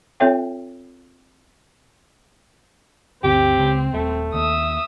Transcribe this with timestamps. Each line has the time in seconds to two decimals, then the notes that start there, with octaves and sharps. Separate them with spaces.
0.20 C4 F4 A4 C#5 E5 G5
3.24 G1 D2 C4 G4
3.58 C#2
3.93 D#1 A3
4.34 D#2 E5 D#6